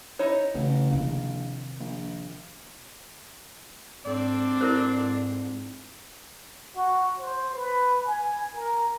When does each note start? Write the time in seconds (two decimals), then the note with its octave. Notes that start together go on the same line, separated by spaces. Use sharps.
0.19 D#4 E4 C#5
0.54 A1 C#3
0.90 A#1 C3 D#3
1.80 A#1
4.05 G#2 C4 D4 A4 D5
4.61 E4 A#4 C5
6.75 F#4
7.20 C5
7.56 B4
8.05 G#5
8.55 A#4